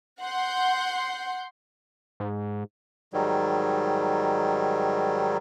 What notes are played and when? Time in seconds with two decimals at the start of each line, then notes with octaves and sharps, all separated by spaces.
0.22 F#5 C6 G6
2.20 G#2
3.13 G#2 D#3 F#3 G3